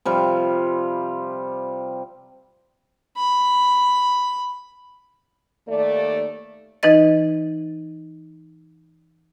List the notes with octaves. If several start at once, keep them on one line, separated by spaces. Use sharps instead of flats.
C3 F3 G3
B5
D#2 A3 D5
E3 D#4 B4 D#5 A6